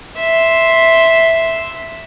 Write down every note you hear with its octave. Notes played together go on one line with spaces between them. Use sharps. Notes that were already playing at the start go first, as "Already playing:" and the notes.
E5 C6